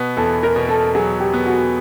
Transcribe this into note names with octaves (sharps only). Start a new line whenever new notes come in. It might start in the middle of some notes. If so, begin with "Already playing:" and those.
Already playing: B2 B3
E2 A4
A#4
B2
A4
F#3 G#4
G4
B3
F#4